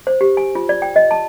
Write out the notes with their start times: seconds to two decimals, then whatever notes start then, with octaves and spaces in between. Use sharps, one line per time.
0.07 C5
0.21 G4
0.37 G#5
0.55 F4
0.69 D5
0.82 G5
0.96 D#5
1.11 A5